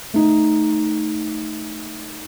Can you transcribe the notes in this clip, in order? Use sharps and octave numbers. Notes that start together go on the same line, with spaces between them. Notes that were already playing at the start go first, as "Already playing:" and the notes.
A3 D#4